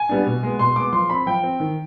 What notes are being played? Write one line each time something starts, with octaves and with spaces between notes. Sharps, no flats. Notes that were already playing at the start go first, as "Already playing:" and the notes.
Already playing: G#5
G3 B3 D4
B2
G#3 B3
B2 C6
G#3 B3 D6
F3 C6
C4 B5
F3 G5
C4
D#3